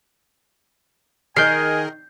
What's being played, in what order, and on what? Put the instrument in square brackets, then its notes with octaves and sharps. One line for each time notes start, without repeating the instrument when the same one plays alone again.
[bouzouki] D#3 [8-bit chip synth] G#4 A#4 D#5 [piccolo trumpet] G#5 [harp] G6 C7